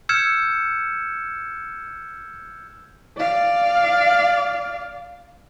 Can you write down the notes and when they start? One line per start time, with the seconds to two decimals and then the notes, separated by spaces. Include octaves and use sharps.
0.09 E6 F6 G6 G#6 C#7 E7
3.17 D5 F5